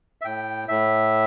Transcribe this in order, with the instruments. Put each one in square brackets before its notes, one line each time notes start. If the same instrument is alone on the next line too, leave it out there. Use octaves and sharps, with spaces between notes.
[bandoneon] E5
A2 G5
A2 E5